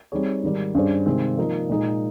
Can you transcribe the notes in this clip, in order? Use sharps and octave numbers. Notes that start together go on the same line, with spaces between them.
G3 C4 D#4 G#4 C#5
G#2 D#3 G3
G2 G3 C#4 G#4 C5
C3 D#3 G#3 C4
F3 A#3 D#4 A#4
A#2 G#3 D#4 A#4